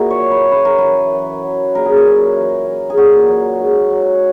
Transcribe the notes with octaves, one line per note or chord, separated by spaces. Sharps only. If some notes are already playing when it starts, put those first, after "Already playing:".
Already playing: A#2 E4 F#4 G#4 A#4
C#5
F#3
B4
F#2 B4
A#4
E3 B4
F#3
F#3
A#2 A#4
G#4
A#4
F#3
E3
E3
G#4
A#2 F#4
F#3
G#2
F#3